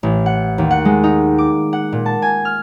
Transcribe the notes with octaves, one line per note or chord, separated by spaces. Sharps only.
A1
F#5
D#2
F#5
G#3
D#4
D6
F#5
A#2
A5
G#5
F6